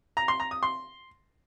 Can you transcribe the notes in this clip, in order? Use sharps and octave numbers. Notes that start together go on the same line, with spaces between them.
A#5
C6
A#5
D#6
C6